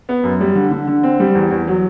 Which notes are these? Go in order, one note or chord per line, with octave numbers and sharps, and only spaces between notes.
B3
F#2
G3
D3
D3
D3
C4
G3
E2
E2
F#3